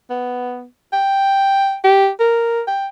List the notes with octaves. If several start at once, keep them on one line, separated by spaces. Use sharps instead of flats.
B3
G5
G4
A#4
G5